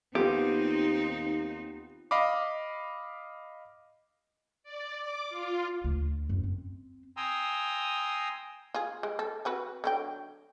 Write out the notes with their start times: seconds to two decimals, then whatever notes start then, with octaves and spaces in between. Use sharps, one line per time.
0.15 D#2 B3 C4 D#4 F4 G4
2.11 D#5 F5 B5 D6
4.63 D5
4.99 D6
5.29 F4
5.84 D2
6.29 F#2
6.44 C4
7.17 G5 G#5 A#5 C6 D#6 E6
8.74 F4 G#4
9.03 G#3
9.19 A4
9.45 C4 F#4 B4
9.84 D3 F#3 G5